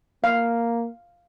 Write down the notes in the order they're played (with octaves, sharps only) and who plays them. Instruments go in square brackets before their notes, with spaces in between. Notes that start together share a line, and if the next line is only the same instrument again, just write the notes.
[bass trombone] A#3 [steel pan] F5